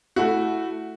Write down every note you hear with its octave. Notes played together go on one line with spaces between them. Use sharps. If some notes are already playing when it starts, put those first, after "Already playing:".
A3 E4 F#4